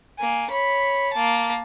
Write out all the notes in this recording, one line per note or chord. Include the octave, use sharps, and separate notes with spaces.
A#3 G#5
C#5 B5
A#3 A5